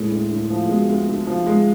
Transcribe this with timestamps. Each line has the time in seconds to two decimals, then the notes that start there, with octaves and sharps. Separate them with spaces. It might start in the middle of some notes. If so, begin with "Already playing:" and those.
Already playing: A2 G#3
0.12 D2
0.31 D3
0.50 F3
0.69 B2 G#3
0.89 D2
1.08 D3
1.27 F3
1.47 G#3